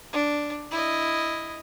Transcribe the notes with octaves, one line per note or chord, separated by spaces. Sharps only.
D4
E4 D#5